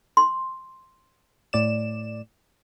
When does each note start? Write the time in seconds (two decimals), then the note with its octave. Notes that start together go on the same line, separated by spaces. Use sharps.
0.17 C6
1.53 A2 D5 E7